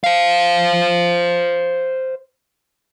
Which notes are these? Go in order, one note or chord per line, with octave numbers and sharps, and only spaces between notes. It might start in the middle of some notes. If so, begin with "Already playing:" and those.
C5 F5